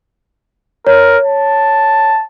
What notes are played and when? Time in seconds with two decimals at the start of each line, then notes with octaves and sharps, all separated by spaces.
0.87 A#4 C#5
1.25 A5